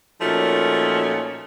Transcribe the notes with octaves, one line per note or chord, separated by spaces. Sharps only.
A#2 F3 F#3 A3 C#4 D#4